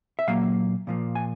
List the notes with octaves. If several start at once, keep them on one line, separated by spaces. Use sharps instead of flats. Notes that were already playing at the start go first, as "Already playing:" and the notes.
E5
A#2 F#3 A#3 F5
A#2 F3 A#3
G#5